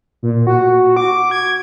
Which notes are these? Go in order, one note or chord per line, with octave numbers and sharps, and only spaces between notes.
A#2
F#4
D6
G#6